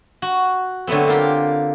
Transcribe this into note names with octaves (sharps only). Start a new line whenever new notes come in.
F#4
D3 F#3 A3 B3 C4
A#3 F4 G4